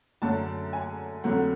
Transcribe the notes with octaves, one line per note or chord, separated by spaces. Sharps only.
F#2 D3 F#3 A3 A5
G#5
F2 D3 F#3 A3 F#5